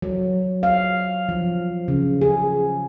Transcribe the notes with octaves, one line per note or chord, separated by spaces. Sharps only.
F#3
F5
F3
C#3
G#4